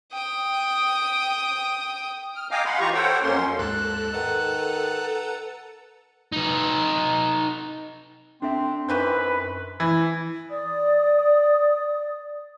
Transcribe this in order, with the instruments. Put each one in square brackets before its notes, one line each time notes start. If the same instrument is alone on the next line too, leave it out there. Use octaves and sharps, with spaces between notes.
[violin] G5 D#6
[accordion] F6
D#5 F5 G5 G#5 A#5 D6
F5 F#5 B5 C6
E3 F4 G4 A#5 C#6
A4 C5 C#5 F#5 G5
F2 F#3 A#3 C#4 C6
[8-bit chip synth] D#2 G#2 G#3 [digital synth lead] A4 [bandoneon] F#6
[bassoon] D#3 [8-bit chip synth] B4 F#5 A#5
[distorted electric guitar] D#4 B4
[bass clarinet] C4 [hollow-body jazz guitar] D4 A4 E5
[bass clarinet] F#2 [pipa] D#3 E3 C4 [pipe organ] B4
[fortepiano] E3
[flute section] D5 D#6